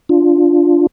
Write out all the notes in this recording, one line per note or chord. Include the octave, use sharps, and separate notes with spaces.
D4 F4